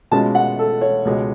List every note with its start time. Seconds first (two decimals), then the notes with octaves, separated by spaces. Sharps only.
0.11 B2 G#3 C#4 F4 A5
0.35 F#5
0.59 A4
0.82 C#5
1.05 C#2 B2 G#3